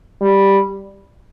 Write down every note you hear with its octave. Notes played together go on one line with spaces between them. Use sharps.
G3